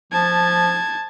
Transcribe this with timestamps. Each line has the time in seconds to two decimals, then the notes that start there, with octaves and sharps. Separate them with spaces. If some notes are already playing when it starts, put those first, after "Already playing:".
0.12 F3 A5 G#6